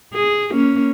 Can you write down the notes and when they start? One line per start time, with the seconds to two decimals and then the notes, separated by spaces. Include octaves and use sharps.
0.14 G#4
0.51 A#3 C#4